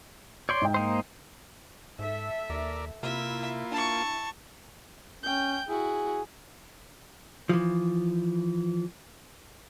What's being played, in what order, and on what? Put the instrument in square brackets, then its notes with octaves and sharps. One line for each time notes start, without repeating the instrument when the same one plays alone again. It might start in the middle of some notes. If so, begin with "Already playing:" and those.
[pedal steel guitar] C#5 D5 C6 [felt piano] G6
[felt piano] G#2 G5
[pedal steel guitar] A#3 D#4 C5
[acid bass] G#2 [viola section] A4 E5
[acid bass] D#2 [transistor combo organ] A#4 D5
[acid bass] C3 [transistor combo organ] A#3 F4 [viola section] E4 [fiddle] E5
[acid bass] D4 [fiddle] A5 C#6
[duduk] C#4 [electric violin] G5 G6
[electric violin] E4 F#4 [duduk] G#4
[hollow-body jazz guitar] E3 F3